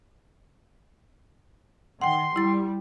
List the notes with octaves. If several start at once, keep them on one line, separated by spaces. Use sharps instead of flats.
D#3 F#5 G5 C6
G3 E4 A6